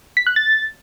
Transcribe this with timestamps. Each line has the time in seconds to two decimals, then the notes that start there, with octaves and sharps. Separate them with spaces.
0.17 B6
0.27 F#6
0.36 A6